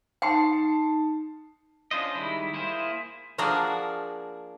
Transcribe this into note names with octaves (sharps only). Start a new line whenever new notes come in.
D#4 F#5 A5 C6 C7 C#7
C#4 D4 F4 C5 D#5
D#3 G3 G#3 E4
A#3 E4 G#4 C5
F3 A#3 D4 F#4 G#4 A#4